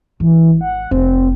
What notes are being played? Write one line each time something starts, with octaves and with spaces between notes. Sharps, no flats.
G#1 E3
F#5
F1 C4